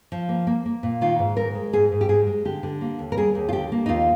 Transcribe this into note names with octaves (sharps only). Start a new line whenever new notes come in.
F3
A#3
A#3
A#3
A#2
D#3 F4
G#2
G#2 A#4
G#3
G#2 G#4
G#2
G4
G#2 G#4
G#3
D3 G4
D3
A#3
D#2
A#4
G3 G#4
D#2
F4
D3 G4
A#3
D#4
D#2 F4